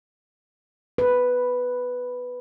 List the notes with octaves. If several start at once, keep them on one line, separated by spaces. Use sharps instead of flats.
B4